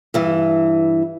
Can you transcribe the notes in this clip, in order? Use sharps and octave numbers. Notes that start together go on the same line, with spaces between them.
G2 E3